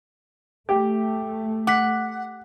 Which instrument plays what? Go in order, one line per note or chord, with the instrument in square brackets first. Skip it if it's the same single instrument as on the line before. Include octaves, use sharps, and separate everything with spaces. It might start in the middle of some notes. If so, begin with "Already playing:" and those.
[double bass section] A3 [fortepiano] G4
[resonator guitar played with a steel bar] F#5 [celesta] D6 B6